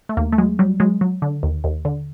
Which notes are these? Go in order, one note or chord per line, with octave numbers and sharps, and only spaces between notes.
A3
D#2 A#3
A3
F#3 G#3
F#3 G3
F#3 G#3
F#3
D3
D#2
D#2
D3